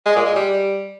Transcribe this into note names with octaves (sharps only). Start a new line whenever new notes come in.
G#3
A#2
G#3
G3